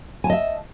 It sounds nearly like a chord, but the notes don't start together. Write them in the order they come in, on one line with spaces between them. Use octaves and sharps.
G#5 A5 D#5 E5